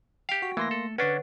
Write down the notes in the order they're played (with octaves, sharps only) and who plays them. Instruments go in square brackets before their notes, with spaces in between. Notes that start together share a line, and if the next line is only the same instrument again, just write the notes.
[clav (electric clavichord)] G4 F5 [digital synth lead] G5
[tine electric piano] F#4 [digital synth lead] G5
[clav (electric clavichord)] E3 [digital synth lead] A3 [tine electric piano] A#3 C6 A#6
[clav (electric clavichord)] A4
[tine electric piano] D3 C#5 F#5 [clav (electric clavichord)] C#4 D4 [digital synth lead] B4